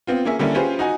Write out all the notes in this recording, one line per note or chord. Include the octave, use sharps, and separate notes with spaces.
B3 C4 F4
A#3 C#4 G#4 E5
D3 G3 A#3 C#4 E4
C#4 F4 G4 G#4 B4 C5
D#4 F#4 G#5